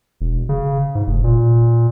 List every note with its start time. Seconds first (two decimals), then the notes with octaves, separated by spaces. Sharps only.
0.21 E1
0.49 C#3
0.95 G#2
1.07 F1
1.24 A#2